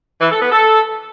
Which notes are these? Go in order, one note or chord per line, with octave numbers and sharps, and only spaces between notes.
E3
A4
B3
A4